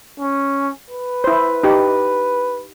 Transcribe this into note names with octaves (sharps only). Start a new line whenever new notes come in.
C#4
B4
E4 C5
D#4 G4